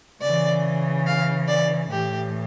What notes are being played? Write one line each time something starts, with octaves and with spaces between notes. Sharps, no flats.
C#3 E3 D5
F5
D5
A2 E3 G4